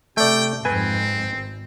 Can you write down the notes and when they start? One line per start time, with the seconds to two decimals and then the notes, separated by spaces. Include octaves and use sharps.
0.17 C3 A3 D5 G5
0.65 F2 G#2 C4 B4 G#5
1.22 G#1